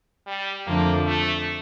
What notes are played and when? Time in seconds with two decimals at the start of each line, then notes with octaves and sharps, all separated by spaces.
0.27 G3
0.66 F2 D3 F3 A3 A#3 D4
1.06 A3